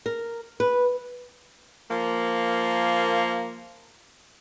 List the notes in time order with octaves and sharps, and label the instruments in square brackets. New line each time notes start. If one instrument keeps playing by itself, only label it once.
[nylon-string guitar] A#4
B4
[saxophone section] F3 A#3